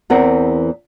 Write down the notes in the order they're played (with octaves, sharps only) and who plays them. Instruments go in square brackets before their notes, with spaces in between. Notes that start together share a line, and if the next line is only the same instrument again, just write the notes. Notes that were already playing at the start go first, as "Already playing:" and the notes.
[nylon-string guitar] E2 E3 C4 A#4 F#5